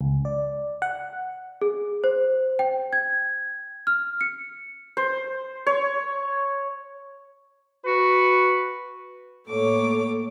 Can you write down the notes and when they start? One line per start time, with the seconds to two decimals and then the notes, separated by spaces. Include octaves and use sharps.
0.01 C#2
0.25 D5
0.82 F#5
1.61 G#4
2.04 C5
2.59 G5
2.93 G#6
3.87 F6
4.21 C#7
4.97 C5
5.67 C#5
7.86 F#4 B4
9.48 A2 A#3 A4 C#5 D6